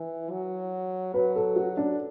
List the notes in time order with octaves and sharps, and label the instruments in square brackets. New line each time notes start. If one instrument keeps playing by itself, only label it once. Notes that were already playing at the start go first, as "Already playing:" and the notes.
Already playing: [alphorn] E3
F#3
[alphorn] F#3 [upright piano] B4
[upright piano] A4
F#4
D4